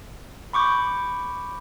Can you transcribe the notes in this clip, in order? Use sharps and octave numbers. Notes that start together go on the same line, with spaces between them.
B5 C#6 D6 G6